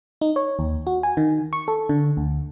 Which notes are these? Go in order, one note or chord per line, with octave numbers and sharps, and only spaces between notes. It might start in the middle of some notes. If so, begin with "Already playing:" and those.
D#4
C#5
D#2
F#4
G#5
D#3
C#6
A4
D3
D2